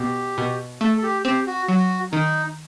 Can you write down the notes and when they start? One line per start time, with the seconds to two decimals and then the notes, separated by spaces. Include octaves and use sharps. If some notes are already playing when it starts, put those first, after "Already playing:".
Already playing: B2 G4
0.38 B2
0.81 A3 A4
0.98 A4
1.03 G4
1.25 C4 G4
1.47 F#4
1.68 F#3 F#4
2.12 D#3 D#4